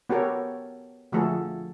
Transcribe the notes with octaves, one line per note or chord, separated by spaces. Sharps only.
B3 F#4 G4 A4 A#4 C#5
D3 F3 A3 F#4 G#4 A4